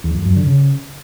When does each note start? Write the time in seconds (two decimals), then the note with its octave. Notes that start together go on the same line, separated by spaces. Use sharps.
0.04 E2
0.15 F2
0.26 F#2
0.36 D3
0.47 C#3